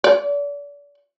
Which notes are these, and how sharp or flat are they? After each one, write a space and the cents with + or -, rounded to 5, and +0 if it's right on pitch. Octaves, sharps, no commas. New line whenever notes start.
D5 -35